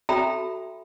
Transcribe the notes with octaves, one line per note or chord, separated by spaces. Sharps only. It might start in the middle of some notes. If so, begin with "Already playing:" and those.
F#4 A4 E5 G5 A#5 B5